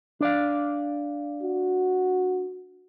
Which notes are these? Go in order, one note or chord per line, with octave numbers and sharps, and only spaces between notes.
D4 D5 F5
F#4